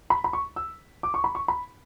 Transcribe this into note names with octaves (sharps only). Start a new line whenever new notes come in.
B5
B5
C#6
E6
D6
C#6
B5
C#6
B5